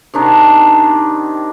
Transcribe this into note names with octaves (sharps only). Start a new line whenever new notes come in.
C3 D#3 D4 D#4